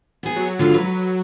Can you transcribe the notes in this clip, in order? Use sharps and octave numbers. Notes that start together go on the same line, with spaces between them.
B3 G#4
F#3
D3 F4
B4